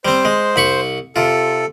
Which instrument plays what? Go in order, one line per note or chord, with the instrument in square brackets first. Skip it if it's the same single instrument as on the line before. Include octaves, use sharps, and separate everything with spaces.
[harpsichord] G3 C4 [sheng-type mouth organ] C5
[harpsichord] G#3
C2 B5 C#6
[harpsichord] C3 F4 [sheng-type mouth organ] A4